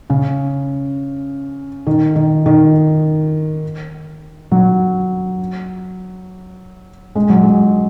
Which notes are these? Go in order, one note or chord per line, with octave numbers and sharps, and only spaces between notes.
C#3
D#3
D#3
D#3
F#3
G#3
F#3
G#3